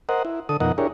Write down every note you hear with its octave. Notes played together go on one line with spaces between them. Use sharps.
A#4 C5 D#5 F#5
E4
D3 A4 D#6
F2 B2 D#4 A#4 D#5 F#5
D4 E4 G4 G#4 A#4 C#5